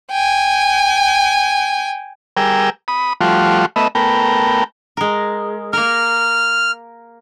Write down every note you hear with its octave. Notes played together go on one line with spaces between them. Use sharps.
G5 G#5
G3 G#4 A#4 G5 E6
B5 D#6
F3 G3 A3 F4 F#4
A3 B3 D#5 E5
A3 B3 A#4 G5
G#3 A#4
A#3 A#4 F6